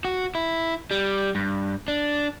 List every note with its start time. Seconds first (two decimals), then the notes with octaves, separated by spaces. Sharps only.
0.05 F#4
0.35 E4
0.91 G3
1.35 G2
1.88 D4